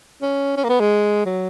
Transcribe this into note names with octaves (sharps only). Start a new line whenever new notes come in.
C#4
C#4
A#3
B3
G#3
F#3